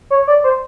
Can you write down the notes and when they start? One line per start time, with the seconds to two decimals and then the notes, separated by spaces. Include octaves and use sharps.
0.10 C#5
0.27 D5
0.44 C5